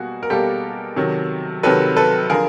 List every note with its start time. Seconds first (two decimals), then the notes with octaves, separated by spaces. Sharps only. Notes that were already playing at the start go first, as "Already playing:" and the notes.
Already playing: B2 G3 A#3 F#4 G#4
0.23 A#4
0.30 B2 G3 A#3 G4 A4
0.96 C3 D#3 F#3
1.63 C3 D#3 F#3 A4 B4
1.96 A4 B4
2.30 D3 F3 G#4 A#4